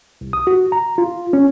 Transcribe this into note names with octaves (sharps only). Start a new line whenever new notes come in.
C2
D#6
F#4
A#5
F4
C#4